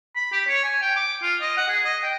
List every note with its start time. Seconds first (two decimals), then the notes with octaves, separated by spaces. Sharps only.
0.16 B5
0.32 G4
0.48 C#5
0.64 G#5
0.82 G5
0.97 D6
1.22 F4
1.41 D#5
1.57 F#5
1.69 G#4
1.85 D#5
2.04 G5